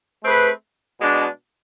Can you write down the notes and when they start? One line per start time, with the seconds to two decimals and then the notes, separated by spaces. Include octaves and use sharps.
0.23 A3 C4 G#4 B4
1.00 B2 G#3 D4